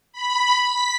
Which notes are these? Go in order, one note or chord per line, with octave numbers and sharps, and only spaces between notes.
B5
B6